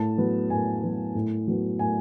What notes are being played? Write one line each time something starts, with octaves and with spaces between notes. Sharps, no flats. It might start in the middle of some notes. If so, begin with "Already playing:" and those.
Already playing: A2 A5
F#3 B3
A2 G#5
F#3 B3
A2
F#3 B3
A2 G#5